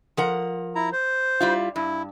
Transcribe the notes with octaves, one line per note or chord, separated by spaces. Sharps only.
F3 A#4 F#5
E4 A#5
C5
G3 E4 F4
G2 E4